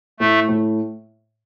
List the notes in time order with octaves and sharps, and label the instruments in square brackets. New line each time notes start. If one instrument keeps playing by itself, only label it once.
[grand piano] A2 [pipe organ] A3
[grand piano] A2